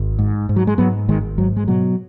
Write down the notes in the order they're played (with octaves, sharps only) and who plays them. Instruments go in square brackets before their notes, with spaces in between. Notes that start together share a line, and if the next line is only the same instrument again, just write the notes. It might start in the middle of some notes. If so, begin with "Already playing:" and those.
Already playing: [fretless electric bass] G#1
G#2
G#2
F#3
G#3
G#2 F#3 B3
G#1 D#3 G#3
G#2 F#3
G#3
B2 F#3